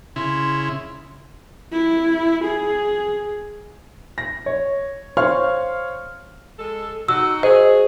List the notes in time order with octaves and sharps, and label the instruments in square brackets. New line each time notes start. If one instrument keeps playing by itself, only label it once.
[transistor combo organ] C#3 E4 [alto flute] C6
[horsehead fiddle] E4
G#4
[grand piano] A#6
C#5
C5 C#5 F5 C6 C#6 F6
[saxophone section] G#3 A4
[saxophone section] D#4 F#4 [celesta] E6
[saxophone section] F#4 G#4 [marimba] C5 [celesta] D#5